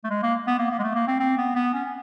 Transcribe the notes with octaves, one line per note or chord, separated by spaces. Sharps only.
A3
G#3
A#3
B3
A#3
A#3
G#3
A3
A#3
C4
C4
B3
B3
C#4